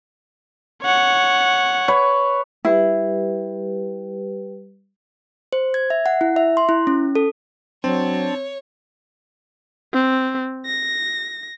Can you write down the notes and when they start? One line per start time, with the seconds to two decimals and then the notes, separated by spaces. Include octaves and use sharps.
0.83 C#5 F#5
1.88 B4 C#5
2.65 G3 E4 G4 B4
5.53 C5
5.74 G#6
5.90 E5
6.06 F#5
6.21 E4
6.36 E5
6.57 C6
6.69 E4
6.87 C#4
7.15 A4
7.84 F#3 C4 D4 C#5 A5
9.93 C4
10.66 A#6